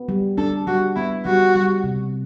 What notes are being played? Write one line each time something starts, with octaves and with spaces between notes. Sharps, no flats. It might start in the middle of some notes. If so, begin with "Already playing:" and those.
Already playing: B3
G3
D4 A4
G3 F#4
B3 E4
G3 F#4
G3
C3